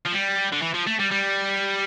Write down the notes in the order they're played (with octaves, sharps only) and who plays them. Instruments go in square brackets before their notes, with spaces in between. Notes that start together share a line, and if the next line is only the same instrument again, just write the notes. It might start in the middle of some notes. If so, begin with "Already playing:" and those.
[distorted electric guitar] F3
G3
D3
E3
F3
A3
G3
G3